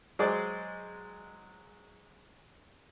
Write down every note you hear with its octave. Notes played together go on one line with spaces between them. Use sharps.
F#3 G#3 G#4 C5 D5